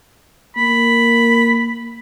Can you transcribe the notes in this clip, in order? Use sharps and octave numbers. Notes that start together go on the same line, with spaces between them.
A#3 B5